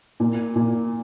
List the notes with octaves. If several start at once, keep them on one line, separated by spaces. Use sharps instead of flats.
A#2
A#2